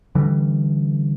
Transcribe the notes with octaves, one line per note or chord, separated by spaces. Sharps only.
D3 E3 G3